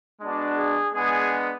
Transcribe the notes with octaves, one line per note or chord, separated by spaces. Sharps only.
G#3 B3 D4 F#4
G#4
G#3 B3 D4 G#4